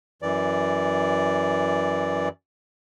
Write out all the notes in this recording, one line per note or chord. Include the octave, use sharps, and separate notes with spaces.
F#2 E3 D5